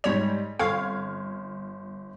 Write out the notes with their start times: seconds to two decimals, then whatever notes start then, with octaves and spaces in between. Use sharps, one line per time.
0.04 G#2 G3 C#5 F7
0.59 G1 C4 A4 F5 C#6 F6 G#6